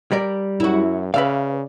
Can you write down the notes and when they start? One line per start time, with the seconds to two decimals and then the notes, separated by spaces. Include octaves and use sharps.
0.12 G3 A#4 D5
0.60 F#2 E4 F#4
1.14 C#3 B4 D5 E5 F5